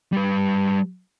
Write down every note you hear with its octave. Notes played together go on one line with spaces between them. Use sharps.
G3 B4